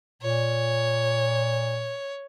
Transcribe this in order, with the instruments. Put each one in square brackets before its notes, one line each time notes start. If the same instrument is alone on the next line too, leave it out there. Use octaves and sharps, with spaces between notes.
[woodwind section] A#2 [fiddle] C#5